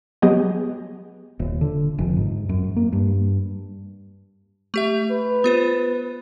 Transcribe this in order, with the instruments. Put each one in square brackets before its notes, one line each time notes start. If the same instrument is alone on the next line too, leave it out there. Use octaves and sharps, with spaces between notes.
[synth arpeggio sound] F#3 B3 G4 G#4 D#5
[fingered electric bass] D#1
D3
F1
G#2
F#2
A#3
G2
[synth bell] A3 G4 E5
[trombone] B4
[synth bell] B3 F4 C5